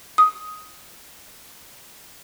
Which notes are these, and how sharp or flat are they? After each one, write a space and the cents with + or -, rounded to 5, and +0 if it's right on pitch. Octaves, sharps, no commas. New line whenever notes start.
D#6 +10